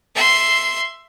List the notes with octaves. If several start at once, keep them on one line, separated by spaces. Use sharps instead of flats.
E5 C6